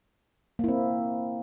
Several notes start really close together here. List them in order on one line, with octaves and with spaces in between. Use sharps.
A#3 E4 C4